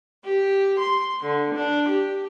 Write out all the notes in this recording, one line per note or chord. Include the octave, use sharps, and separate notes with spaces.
G4
C6
D3
D4
G4